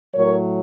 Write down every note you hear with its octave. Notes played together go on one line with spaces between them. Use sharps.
A2 F#3 A#4 C#5